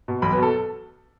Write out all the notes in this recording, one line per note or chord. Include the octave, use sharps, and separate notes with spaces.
B2
B1 B5
B4
B2 A4